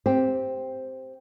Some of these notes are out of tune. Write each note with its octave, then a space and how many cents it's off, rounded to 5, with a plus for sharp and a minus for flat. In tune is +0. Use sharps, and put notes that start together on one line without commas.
C4 +0 G4 +0